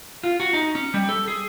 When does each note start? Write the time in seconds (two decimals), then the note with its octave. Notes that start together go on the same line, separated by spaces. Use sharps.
0.24 F4
0.40 F#4
0.53 D#4
0.75 C#4
0.94 G3
1.09 A4
1.28 G#4